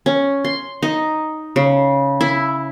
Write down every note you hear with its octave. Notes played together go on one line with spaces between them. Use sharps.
C#4
C6
D#4
C#3
E4